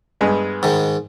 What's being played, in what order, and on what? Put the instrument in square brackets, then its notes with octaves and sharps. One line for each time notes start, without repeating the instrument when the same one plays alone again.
[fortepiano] G2 G#3 B3
[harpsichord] G#2 D#3